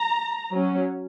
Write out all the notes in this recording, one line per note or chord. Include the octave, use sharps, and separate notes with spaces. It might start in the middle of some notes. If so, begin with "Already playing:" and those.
Already playing: A#5
F#3 C#4